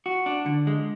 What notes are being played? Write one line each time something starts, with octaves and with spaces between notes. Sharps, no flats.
F#4
D4
D3
G#3